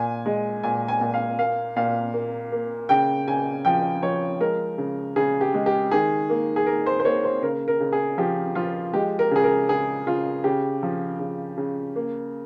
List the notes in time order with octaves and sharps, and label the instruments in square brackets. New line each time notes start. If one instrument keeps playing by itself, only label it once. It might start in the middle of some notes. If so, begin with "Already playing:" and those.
Already playing: [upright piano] A#2 G#5
G#3
A#2 G#5
G#5
A#2
F5
A#3 F5
A#2 F5
A#3
A#3
C#3 G5
C#3 G#5
F3 G5
F3 C#5
G#3 A#4
C#3
C#3 G#4
G4
G#3
G4
D#3 G#4
A#3
G#4
A#3 A#4
C5
C5
A#3 C#5
C5
C#3 A#4
A#4
C#3
G#4
F3 G4
F3 F4
G#3 G4
A#4
C#3 G#4
A#4
C#3 G#4
C#3 F4
C#3 G4
F3
C#3
C#3
A#3